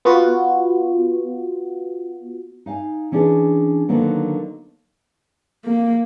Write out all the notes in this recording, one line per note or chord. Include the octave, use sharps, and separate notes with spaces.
B3 F4 F#4
D#4 F5 G#5
E3 C#4 D4 G#4 B4
D3 D#3 F#3 A#3 B3
A#3